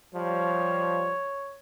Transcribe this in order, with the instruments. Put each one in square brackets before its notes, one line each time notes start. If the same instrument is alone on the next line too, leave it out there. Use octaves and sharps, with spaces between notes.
[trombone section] F3 G3 [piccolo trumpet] C#5